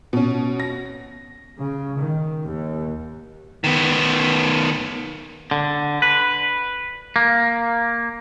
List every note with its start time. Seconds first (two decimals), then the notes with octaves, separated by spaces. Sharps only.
0.13 B2 C#4
0.60 A#6
1.58 C#3
1.98 D#3
2.44 D#2
3.64 D#3 B3
5.51 D3
6.02 B4
7.16 A#3